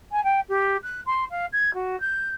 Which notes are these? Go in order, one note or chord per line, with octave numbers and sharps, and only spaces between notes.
G#5
G5
G4
F#6
C6
F5
G#6
F#4
G6